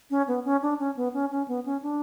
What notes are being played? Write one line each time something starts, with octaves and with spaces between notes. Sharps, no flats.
C#4
B3
C#4
D4
C#4
B3
C#4
C#4
B3
C#4
D4